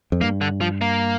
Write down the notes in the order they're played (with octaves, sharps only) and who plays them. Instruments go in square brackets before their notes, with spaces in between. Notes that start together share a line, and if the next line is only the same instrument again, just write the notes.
[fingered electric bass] F2
[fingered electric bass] G2 [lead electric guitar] A#3
[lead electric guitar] D3
F3
A#3